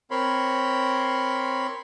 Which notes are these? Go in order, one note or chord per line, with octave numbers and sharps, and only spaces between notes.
C4 A#4 C#5 B5 C6